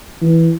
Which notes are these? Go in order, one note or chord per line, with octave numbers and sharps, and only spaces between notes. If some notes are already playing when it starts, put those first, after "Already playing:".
E3